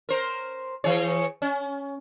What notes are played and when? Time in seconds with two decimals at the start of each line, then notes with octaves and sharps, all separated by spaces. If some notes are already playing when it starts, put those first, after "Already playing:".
0.09 A#4 C5
0.84 E3 G#4 C#5
1.42 C#4